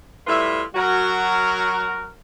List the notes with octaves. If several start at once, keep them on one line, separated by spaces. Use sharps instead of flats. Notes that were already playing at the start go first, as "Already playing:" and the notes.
A2 G3 F4 B4 E5
F#3 F#4 A#4